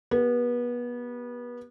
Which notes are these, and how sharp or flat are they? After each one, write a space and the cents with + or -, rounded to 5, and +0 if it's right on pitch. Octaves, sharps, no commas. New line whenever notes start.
B3 -25 G4 +0